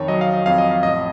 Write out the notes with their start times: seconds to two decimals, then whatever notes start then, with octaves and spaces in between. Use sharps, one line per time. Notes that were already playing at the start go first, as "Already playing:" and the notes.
Already playing: F2 D#3 C#5
0.08 F#3 D#5
0.21 F5
0.33 D#5
0.46 F2 F5
0.58 D#5
0.71 F5
0.83 A1 D#5